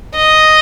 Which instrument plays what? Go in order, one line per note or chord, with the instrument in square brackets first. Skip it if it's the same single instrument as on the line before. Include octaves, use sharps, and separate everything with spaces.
[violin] D#5